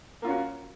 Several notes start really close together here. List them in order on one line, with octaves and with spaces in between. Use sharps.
A#3 F4 C#4 F#4